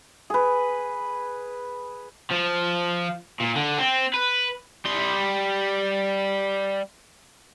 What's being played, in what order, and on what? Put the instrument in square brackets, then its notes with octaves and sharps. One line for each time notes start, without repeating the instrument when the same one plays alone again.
[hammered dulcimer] G#4 B4
[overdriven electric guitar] F3
A#2
D3
C4
B4
G3 C6